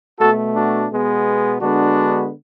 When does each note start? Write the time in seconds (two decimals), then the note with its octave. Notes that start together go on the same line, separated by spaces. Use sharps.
0.19 B2 A3 F#4 A4
0.55 D4 F#4
0.90 B2 G#3 B3
1.60 D3 G#3 B3 D4 F#4